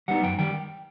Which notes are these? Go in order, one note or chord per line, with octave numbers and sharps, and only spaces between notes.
G3 B3 D#4 F#5
F#2 G5
D#3 G3 G5